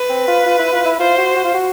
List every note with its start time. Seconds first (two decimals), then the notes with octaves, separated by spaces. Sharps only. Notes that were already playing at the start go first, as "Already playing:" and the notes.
Already playing: B4
0.09 C4
0.28 F4
0.45 F4
0.59 E4
0.72 F4
0.86 E4
1.00 F4 C5
1.18 F#4
1.36 F#4
1.45 F4
1.54 F#4